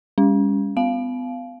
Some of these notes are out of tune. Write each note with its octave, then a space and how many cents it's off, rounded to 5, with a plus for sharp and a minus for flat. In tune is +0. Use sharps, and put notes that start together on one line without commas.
G#3 -45 C#4 +15
B3 +30 F5 -10 A5 -45